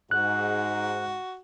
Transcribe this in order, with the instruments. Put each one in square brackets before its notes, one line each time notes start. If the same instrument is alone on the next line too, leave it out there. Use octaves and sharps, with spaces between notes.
[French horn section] G#2 [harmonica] F#4 [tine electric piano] F#6